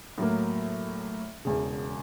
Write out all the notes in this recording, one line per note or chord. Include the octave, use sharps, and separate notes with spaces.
A2 F#3 A#3
E1 E2 C#3